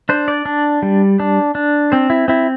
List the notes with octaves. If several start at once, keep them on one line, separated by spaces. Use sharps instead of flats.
D4 C5
D5
D4
G3
D4
D4
C4 C5
E4
C4 E4